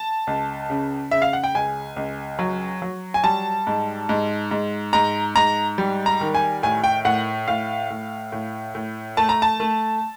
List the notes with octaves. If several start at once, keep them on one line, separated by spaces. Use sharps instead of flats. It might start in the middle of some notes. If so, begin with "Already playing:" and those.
Already playing: A5
C#2
C#3
C#3 E5
F5
F#5
G5
C#2 G#5
C#2
F#3
F#3
G#5
G3 A5
G#2
G#2
G#2
G#2 A#5
G#2 A#5
G3
A#5
D#3
G#5
A2 G#5
G5
A2 F#5
A2 F5
A2
A2
A2
A3 A5
A#5
A5
A3